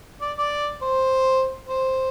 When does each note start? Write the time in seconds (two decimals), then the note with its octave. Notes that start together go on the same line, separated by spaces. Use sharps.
0.21 D5
0.37 D5
0.82 C5
1.69 C5